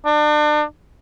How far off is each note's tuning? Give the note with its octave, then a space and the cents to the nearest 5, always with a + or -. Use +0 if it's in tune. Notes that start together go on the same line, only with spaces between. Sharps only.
D4 +35